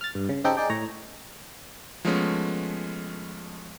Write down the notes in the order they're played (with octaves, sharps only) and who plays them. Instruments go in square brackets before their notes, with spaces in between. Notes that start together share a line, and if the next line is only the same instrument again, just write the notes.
[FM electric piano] F6 A6
G2
C#3
C#3 C4 D#4 G4 A4 G5
D#4 G#4 D5 G5
A2 C#5 A#5
[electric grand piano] F3 G#3 A3 B3 C#4